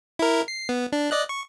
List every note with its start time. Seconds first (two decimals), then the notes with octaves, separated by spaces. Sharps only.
0.19 E4 A#4
0.48 C7
0.69 B3
0.92 D4
1.11 D5 D#5 F#6
1.29 C#6